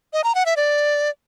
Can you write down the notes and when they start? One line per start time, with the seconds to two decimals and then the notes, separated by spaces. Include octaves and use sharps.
0.13 D#5
0.24 A#5
0.35 F#5
0.46 E5
0.57 D5